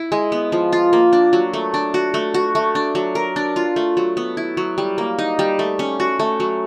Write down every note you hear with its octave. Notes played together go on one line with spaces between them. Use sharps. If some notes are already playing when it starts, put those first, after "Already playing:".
Already playing: E4
G#3
B3
F3
F4
A#3
D4
F#3
A3
D4
F#4
A3
F#4
A3
D4
F#3
A#4
D4
F4
A3
F#3
B3
E4
F#3
G3
A#3
D#4
G3
A3
C#4
F#4
A3
F#3